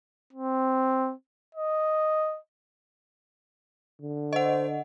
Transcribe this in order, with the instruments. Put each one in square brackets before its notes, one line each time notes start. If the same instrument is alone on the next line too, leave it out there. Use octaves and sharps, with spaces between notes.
[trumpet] C4
D#5
[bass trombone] D3
[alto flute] C5 [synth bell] D#5 F#5